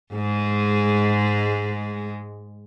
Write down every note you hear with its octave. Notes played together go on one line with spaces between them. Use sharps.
G#2 G#3